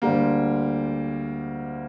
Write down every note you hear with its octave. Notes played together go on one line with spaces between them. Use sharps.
D2 D3 G3 A#3